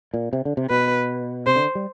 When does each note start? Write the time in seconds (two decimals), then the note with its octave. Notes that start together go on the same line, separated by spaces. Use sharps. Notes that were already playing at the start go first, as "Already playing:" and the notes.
0.14 A#2
0.33 C3
0.45 D3
0.57 C3
0.70 B2 B4
1.47 C3 C5
1.56 D3
1.75 G3